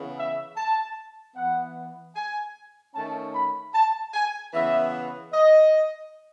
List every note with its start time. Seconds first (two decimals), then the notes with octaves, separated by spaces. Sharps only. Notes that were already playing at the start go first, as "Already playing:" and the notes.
Already playing: C#3 E3 B3
0.17 E5
0.57 A5
1.35 E3 B3 F#5
2.15 G#5
2.94 D#3 A3 C#4 A5
3.34 B5
3.74 A5
4.13 G#5
4.54 C#3 E3 B3 E5
5.33 D#5